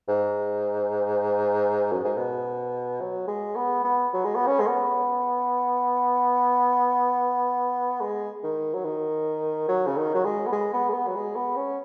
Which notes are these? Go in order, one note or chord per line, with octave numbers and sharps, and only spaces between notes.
G#2
F#2
G#2
B2
F#3
G#3
B3
B3
F#3
G#3
B3
C#4
G#3
B3
G#3
D#3
F#3
D#3
F#3
C#3
D#3
F#3
G#3
B3
G#3
B3
G#3
B3
F#3
G#3
B3
C#4